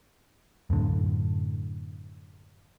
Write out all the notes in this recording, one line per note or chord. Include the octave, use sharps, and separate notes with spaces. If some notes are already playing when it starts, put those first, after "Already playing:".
F#2 A2 D3